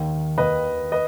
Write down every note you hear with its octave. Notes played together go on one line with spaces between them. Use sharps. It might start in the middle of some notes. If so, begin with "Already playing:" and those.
Already playing: D#2 D#3
D#2 D#3 B4 D#5
B4 D#5